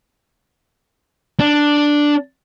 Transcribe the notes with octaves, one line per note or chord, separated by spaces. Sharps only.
D4